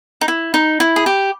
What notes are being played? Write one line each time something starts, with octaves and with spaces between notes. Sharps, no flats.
D#4
E4
D#4
E4
G#4
G4